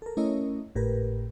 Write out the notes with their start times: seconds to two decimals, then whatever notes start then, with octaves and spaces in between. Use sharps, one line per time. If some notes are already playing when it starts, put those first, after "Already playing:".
0.02 A4 A#4
0.17 A3 C#4 E4 A#4 C#5 D#5
0.75 G#1 A2 G4 A#4 B4